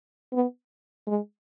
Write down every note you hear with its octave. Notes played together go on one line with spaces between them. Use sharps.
B3
G#3